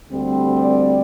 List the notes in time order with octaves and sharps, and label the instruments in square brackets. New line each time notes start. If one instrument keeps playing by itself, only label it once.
[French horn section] D2 D3 G3 C4
D5